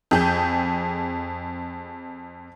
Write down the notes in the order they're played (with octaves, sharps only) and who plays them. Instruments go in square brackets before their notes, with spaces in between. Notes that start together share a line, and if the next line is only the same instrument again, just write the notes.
[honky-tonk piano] F2 G#4 G6